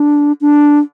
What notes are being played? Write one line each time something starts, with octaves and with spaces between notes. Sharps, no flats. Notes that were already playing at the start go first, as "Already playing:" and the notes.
Already playing: D4
D4